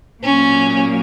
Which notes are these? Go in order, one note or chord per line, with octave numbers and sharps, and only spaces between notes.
A#2 F#3 A#3 C#4